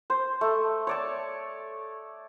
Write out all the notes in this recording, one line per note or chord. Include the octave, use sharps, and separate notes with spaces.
C5
A3
C#5 D5 A5